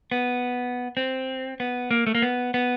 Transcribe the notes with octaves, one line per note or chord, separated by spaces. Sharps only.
B3
C4
B3
A#3
A3
A#3
B3
B3